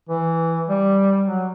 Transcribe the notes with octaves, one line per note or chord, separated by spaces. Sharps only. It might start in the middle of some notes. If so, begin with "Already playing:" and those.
E3
G3
F#3